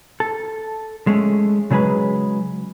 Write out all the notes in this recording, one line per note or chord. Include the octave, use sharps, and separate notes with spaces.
A4
G#3 A3 C#4
C#3 F#3 G#3 G#4 B4